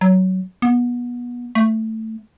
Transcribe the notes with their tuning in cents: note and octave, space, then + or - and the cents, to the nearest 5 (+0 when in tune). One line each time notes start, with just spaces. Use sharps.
F#3 +15
B3 -25
A3 +10